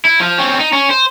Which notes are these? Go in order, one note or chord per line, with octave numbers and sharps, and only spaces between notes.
E4
F3
C4 C#4
D#4
C#4
C5